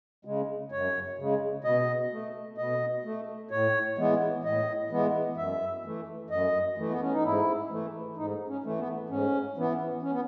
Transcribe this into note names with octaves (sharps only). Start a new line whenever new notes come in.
C#3 G#3
F#2 C#5
C#3 G#3
B2 D#5
A3
B2 D#5
A3
A2 C#5
E3 G#3 B3
A2 D#5
E3 G#3 B3
F#2 E5
E3 A3
F#2 D#5
E3 A3
B3
C#4
D#4
G#2 E4
E3 A3
G#2 D#4
C#4
E3 A3
B3
G#2 C#4
E3 B3
C#4
B3